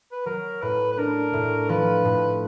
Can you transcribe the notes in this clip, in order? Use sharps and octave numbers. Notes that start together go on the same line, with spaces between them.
B4
F#3 A#4
A2 B4
B4
D4 A#4
A2
F3 B4
A2